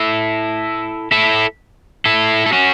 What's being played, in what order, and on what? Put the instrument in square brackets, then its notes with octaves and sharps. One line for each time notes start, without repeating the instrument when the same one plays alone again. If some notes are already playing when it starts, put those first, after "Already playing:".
Already playing: [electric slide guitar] E4 A4
E4 A4
E4 A4
A4
C#4 F#4